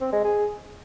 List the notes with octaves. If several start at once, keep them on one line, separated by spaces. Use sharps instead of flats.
C4
G#3
G#4